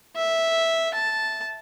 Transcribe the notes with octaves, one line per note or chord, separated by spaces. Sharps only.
E5
A5